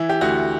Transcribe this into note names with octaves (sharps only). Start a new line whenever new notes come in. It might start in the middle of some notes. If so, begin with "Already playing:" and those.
Already playing: E3 E4
G4
D2 F#4